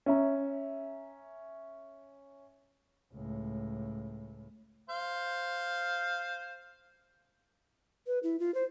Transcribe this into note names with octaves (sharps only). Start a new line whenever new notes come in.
C#4 E5 A#5
C#2 A2
C5 F5
B4
E4
F4
C5